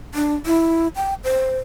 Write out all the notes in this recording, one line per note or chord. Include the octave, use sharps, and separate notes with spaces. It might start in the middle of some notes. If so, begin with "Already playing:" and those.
D4
E4
G5
C5